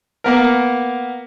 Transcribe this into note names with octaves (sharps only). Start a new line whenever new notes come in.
A#3 B3 A#4